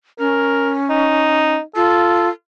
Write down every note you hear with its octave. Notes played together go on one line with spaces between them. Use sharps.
C#4 A#4
D#4
F4 A4